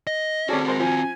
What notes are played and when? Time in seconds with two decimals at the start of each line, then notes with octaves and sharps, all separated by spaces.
0.07 D#5
0.49 C2 C4 C#4 F#4 G#4 A4 D5
0.68 G#3 A#4 C5
0.80 F3 G#5